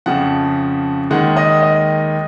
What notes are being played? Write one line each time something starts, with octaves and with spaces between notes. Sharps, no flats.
F2 C#3 F3 F#5
D#2 D#3 G#3 F#5
D#5
D#5